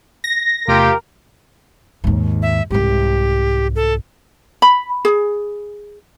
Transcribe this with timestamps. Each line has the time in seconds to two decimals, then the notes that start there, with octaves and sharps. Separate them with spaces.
0.24 A#6
0.68 E2 C3 A3 F4 G4 A#4
2.04 D#2 G#2
2.42 E5
2.71 C2 G#2 G4
3.76 A4
4.62 B5
5.05 G#4